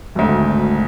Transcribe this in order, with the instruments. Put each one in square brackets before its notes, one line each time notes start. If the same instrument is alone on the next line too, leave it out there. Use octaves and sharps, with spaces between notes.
[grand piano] G#1 D2